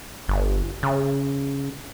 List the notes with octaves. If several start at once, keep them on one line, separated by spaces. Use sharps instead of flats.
G1
C#3